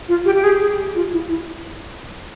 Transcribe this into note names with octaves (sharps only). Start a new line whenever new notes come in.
F4
G4
G4
G#4
G#4
G4
F4
E4
E4